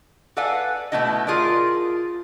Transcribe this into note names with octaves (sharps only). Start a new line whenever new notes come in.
A4 B4 D5 F5 F#5 G#5
B2 A3 B3 D#4 E4 D#5
F4 G#4 A#4 D5